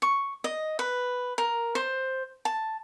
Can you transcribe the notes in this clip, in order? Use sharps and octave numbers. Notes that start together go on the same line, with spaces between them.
C#6
D#5
B4
A#4
C5
A5